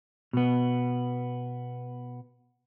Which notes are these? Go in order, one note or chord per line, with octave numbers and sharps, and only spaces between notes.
B2 B3